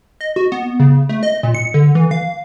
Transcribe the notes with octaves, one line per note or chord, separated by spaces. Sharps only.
D#5
F#4
B3
C#3
A3
D#5
A#2
C#7
D3
E3
F5